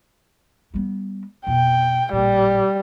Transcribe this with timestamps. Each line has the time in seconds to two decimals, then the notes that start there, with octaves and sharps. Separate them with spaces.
0.74 G3 B3
1.47 F2 B2 G5
2.13 A1 A#2 G3